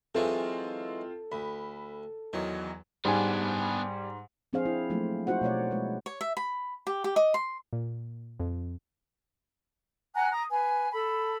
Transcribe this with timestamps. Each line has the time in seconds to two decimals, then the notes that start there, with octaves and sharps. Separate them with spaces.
0.15 E3 F#3 G#3 C4 F4 A4
1.32 D2 B5
2.33 E2 D#3 E3 F#3
3.05 G#2 G3 B3 D4 G#5
4.53 F3 C4 D4 G#4 C5 F5
4.65 E4
4.90 F3 F#3 A3 A#3 F4
5.27 D#4 F4 F#4 C5 F#5
5.41 B2 A3 C#5 D5
5.71 G#3 B4
6.06 C#5
6.21 E5
6.37 B5
6.87 G4
7.04 G4
7.16 D#5
7.34 C6
7.73 A#2
8.40 F2
10.14 F#5 G#5 A#5 F#6
10.30 A#5 D#6
10.49 B4 G#5
10.91 A4 B5